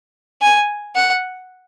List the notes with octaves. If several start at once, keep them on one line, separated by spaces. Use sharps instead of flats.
G#5
F#5